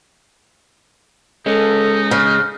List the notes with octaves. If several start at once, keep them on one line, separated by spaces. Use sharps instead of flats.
G#3 C#4 D#4 A4
C#3 F6